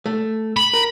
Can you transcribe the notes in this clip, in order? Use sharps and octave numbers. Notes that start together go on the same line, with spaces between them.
A3
B5
A#4